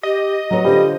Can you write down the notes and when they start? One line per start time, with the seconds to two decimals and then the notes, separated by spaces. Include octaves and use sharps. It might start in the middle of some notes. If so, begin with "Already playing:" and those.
0.03 G4 D#5
0.51 F#3 B4 C#5 A#5
0.65 D3 G3 F4 C5